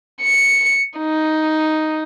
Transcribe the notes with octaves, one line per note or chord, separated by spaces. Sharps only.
C#7
D#4